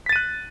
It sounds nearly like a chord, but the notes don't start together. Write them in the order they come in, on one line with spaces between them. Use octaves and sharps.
B6 A6 D#7 F#6